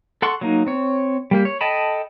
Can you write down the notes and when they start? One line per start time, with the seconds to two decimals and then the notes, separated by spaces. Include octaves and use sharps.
0.22 A4 F#5 C6 C#6
0.41 F#3 A#3 D#4
0.66 C4 C#5
1.31 G3 A#3 G4
1.45 C#5
1.61 A4 D#5 G5 A5 B5